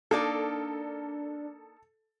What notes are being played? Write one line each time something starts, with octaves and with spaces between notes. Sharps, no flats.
A#3 D4 D#4 A4 D5